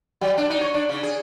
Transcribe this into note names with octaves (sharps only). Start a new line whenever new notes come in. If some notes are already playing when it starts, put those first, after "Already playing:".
F#3
D4
D#4
C#5
D4
C#3
G#4